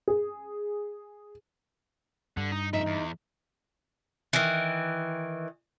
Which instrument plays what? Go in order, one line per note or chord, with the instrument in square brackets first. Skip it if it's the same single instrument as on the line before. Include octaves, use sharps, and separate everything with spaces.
[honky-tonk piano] G#4
[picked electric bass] G2 [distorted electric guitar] D3
[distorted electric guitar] D#4
[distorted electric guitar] F2 E5 [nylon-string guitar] D#4
[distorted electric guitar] E2
[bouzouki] D#3 E3